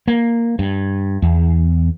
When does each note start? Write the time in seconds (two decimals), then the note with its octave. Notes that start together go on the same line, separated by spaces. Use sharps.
0.08 A#3
0.59 G2
1.22 E2